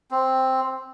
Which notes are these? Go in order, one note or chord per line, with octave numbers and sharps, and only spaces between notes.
C4